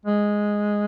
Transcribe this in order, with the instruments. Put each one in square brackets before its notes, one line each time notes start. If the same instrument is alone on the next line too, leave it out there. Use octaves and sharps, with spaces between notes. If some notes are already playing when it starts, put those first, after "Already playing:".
[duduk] G#3